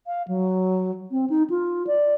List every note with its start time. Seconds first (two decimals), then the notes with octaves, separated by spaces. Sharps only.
0.07 F5
0.28 F#3
1.11 C4
1.30 D#4
1.50 F4
1.87 D5